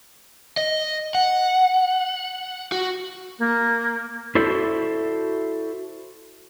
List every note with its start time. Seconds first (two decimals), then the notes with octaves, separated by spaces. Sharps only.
0.57 D#5
1.15 F#5
2.72 F#4
3.39 A#3
4.35 E4 F#4 A4 C5 D5 E5